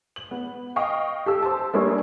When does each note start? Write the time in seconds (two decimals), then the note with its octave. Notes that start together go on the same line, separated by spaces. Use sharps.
0.16 F#7
0.31 B3
0.76 D#5 F5 G5 C#6
1.26 G4 A4 E6
1.42 C5 A5
1.73 G3 A#3 D4 G#4 A#4 C#5